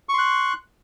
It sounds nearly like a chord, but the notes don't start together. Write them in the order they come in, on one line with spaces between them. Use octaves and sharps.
C#6 C6 F#6